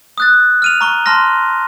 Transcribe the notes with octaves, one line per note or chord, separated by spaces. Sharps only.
D#6 F#6 A6
F6 D#7 F7
A#5 C#6 G7
A5 C6 F6 A#6